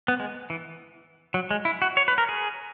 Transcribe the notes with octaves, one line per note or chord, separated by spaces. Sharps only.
B3
G#3
E3
F#3
G#3
E4
F#4
C#5
B4
A#4
G#4